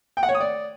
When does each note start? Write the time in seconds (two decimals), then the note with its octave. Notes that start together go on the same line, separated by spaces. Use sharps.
0.17 G5
0.23 F#5
0.29 C#5
0.35 D#6
0.40 D5